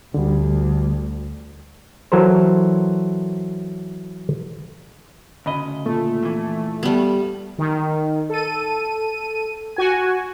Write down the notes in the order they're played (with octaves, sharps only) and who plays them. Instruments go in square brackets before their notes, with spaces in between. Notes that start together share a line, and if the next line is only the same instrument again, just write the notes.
[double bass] D2 [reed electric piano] D3 G3
[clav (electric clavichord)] E3 F#3 A4 A#4 C5
[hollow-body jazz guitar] D2 C#3 D#5 [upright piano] B5
[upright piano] A#2 [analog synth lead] A3
[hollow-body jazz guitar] F2 E3
[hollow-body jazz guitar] G2 [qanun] G3 B3
[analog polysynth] D#3
A4 D#7
F#4 G#5